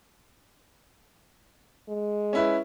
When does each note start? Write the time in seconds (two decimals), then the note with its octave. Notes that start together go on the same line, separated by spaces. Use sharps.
1.88 G#3
2.33 C#4 E4 B4